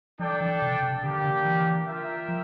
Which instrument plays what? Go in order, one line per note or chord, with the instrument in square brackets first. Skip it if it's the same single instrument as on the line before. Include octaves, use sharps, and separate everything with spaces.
[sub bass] F3 [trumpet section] D4 A4 D5 G5
[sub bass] E3
C3
C3
[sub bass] D3 [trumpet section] A#3 D4 G4
[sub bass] D3
E3
[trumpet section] F4 A#4 E5 G5
[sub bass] F3